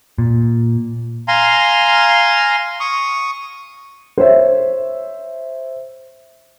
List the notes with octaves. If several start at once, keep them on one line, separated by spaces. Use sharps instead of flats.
A#2
F5 G#5 A#5 C6
C#6 D#6
C5 C#5 E5